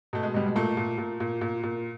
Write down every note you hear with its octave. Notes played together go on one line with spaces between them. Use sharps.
B2 A3
G#3
B2 G3
G#3
A#2 A3
A#2
A#2
A#2
A#2
A#2